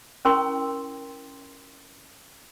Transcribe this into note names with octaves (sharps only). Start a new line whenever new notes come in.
C#4 E4 A#4 G5 C6 C#6